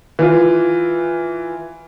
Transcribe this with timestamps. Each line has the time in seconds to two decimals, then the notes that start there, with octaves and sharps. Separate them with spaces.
0.19 E3 F4